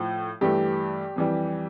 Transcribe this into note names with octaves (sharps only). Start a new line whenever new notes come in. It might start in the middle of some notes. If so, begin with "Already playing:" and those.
Already playing: A2 F3 A3
G2 E3 A3 G4
F2 E3 G3